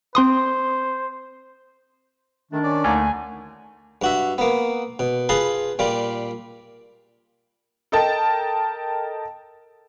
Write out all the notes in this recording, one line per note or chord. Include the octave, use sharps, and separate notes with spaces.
C4 C5 C6 D#6
D#3 A3 D4
C#4 D5
D2 A#3 D#4 G#5
G2 F#4 E5
A#3 B3
B2
F4 G#4 B4 A5 C6
A#2 G3 F4
A4 A#4 D#5 G5 A5